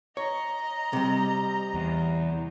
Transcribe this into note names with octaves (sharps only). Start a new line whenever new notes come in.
C#5 D#5 A#5
C3 G3
E2